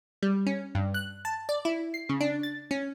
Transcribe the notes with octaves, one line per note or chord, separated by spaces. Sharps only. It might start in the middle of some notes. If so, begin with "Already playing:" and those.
G3
C#4
G2
F#6
A5
D5
E4
C7
C#3
D4
A6
C#4